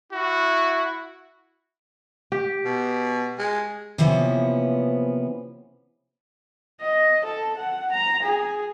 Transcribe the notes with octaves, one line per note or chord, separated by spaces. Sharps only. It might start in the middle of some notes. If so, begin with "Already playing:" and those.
E4 F#4
G4
B2
G#3
C3 E3 F3 A#3 B3 C#4
D#5
A4
F#5
A#5
G#4